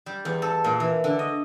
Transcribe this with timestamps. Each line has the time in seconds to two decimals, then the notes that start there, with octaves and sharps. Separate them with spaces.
0.06 G3
0.25 E2
0.42 A4
0.64 A#2
0.80 E3
1.04 D3
1.19 D#5